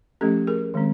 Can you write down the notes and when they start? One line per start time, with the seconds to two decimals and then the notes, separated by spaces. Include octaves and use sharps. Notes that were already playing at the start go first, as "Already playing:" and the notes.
0.21 F3 A3 C#4 G4 A4
0.47 G#4 A#4
0.74 D#3 G#3 C4